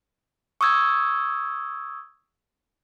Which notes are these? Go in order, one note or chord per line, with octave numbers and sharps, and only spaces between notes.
C#6 D#6 E6 G#6